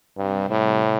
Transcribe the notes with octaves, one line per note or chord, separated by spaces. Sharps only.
G2 C3 G3 C4
A2